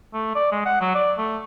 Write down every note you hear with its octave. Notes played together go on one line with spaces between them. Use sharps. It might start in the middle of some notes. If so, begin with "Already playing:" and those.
A3
D5
G#3
F#5
F#3
D5
A3